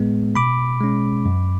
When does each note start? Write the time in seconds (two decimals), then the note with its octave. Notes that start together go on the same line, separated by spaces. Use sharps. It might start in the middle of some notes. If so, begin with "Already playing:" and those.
Already playing: A2 G#3 B3
0.35 B2 B5 D6
0.81 G#3 C#4
1.26 F#2